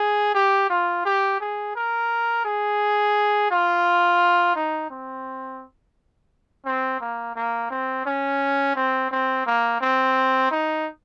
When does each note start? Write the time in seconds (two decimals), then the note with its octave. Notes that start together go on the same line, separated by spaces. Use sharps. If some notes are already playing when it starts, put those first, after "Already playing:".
Already playing: G#4
0.34 G4
0.70 F4
1.05 G4
1.40 G#4
1.75 A#4
2.45 G#4
3.51 F4
4.55 D#4
4.90 C4
6.66 C4
7.00 A#3
7.35 A#3
7.70 C4
8.06 C#4
8.75 C4
9.11 C4
9.46 A#3
9.81 C4
10.51 D#4